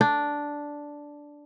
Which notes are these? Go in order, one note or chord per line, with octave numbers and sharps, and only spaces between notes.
D4